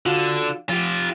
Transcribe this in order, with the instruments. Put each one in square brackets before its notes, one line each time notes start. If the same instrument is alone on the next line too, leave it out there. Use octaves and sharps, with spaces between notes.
[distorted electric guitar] D3 [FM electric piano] F4 F#4 F5
[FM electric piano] F3 [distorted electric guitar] F4 G4